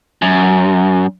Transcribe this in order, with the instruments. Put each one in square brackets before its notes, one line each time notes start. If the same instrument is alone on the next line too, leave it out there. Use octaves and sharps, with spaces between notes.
[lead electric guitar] F#2